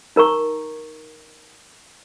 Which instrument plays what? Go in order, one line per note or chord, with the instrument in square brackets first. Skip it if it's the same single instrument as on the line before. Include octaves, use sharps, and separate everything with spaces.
[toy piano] D#4 A#4 A#5 C#6